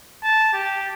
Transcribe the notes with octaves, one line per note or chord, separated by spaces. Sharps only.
A5
G4